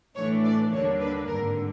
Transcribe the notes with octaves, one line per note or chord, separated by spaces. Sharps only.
A2 E3 A3 D4 C#5
D5
D#2 D3 G3 A#3 D4 C#5
B4
G#1 G2 D3 A#4